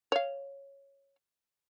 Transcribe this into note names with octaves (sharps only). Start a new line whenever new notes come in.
C#5 F5